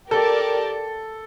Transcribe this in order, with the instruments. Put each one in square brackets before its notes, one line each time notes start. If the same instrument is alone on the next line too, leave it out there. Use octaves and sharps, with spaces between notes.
[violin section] G4 A#4 D5 A5 [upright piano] A4